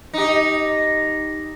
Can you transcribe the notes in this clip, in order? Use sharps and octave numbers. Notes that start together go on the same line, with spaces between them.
D#4 G4